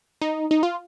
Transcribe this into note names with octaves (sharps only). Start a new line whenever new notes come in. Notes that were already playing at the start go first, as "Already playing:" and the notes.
D#4
D#4
F4